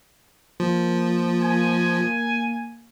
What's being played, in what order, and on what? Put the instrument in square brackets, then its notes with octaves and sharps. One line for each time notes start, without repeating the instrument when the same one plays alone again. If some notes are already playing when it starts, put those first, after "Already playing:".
[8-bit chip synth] F3 [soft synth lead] A#3
[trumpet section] G#5